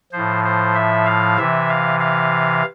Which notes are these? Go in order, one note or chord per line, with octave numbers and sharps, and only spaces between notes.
A2 F3 C5
C5
E5
F5
C3 E3 E5
F5
F5